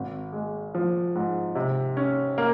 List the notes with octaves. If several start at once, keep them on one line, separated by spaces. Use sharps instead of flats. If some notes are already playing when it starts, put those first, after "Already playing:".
Already playing: G#1
G#3
F3
G#2
C3
C#4
A#3